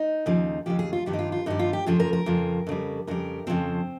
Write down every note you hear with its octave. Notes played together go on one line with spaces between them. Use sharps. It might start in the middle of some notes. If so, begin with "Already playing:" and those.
Already playing: D#4
D#2 C#3 F3
D#2 C#3 F3 G4
G#4
F4
G2 D#3 G3 G4
D#4
F4
F4
G2 D#3 G3 D#4
F4
G4
F2 C#3 F3 G#4
A#4
A#4
F2 C#3 F3
F2 C#3 G3
F2 C#3 G3 A#4
F2 C#3 F3 C4